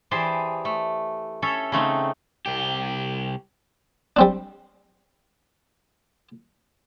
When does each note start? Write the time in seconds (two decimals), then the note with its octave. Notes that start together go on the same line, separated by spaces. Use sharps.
0.11 E3 G4 G#4 C5 D5 A5
0.65 A3
1.42 C#4 A4 C#5 E5
1.72 C#3 A3 C4 D#4
2.46 C2 G4
4.16 G3 C4 D4